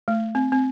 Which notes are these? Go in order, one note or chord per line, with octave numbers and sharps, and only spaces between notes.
A3
C4
C4